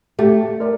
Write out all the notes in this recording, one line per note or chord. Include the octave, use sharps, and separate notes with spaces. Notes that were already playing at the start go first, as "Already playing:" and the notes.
A3 G4
A#4 D5